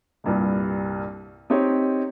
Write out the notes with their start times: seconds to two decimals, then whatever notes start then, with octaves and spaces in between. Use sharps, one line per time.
0.24 C2 G2 A#2
1.50 C4 D#4 G4 C#5 D#5